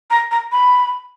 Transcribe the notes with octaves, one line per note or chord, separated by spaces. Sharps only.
A#5
A#5
B5